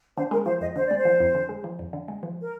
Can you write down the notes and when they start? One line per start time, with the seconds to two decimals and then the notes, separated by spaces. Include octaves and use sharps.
0.17 D3 C5
0.31 G#3 A#4
0.46 F3 C5
0.61 F2 D#5
0.76 D3 C5
0.86 G#3 D5
0.97 C5
1.05 F3
1.20 F2
1.35 D3
1.49 G#3
1.64 F3
1.79 F2
1.93 D3
2.08 G#3
2.23 F3
2.43 A#4